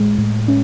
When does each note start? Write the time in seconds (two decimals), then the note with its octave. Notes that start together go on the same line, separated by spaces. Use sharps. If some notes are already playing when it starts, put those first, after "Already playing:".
Already playing: A2 G#3
0.18 A2
0.48 C#4